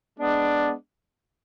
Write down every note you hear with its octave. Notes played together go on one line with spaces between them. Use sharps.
G#3 B3 D4